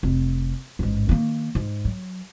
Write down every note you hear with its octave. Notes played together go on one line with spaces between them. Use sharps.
F1
A1 G#2
D#3 A#3
G#2
F#3